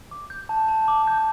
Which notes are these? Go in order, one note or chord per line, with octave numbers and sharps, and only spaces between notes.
D6
G6
A5
A5
D6
G6